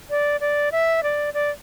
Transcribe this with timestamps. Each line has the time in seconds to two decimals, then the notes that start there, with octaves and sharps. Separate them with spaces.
0.10 D5
0.41 D5
0.72 E5
1.03 D5
1.34 D5